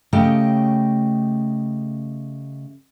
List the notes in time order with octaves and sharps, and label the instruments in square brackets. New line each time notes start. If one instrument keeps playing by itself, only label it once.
[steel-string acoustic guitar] C#3 A3 G4 D#5 G5